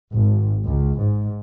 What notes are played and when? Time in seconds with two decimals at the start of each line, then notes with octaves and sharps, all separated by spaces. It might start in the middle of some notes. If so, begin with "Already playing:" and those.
0.13 G#1
0.65 C#2
0.99 G#2